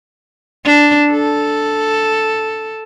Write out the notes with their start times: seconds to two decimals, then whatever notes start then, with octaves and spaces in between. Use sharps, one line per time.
0.65 D4
1.12 A4